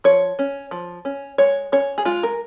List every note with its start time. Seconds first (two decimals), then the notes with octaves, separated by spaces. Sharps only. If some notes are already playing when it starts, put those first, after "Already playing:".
0.04 F3 C#5
0.39 C#4
0.71 F3
1.05 C#4
1.38 G#3 C#5
1.72 C#4 C#5
1.98 G#4
2.05 G#3 F4
2.23 A#4